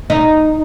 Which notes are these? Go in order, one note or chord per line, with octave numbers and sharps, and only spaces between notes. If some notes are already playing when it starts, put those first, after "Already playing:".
D#4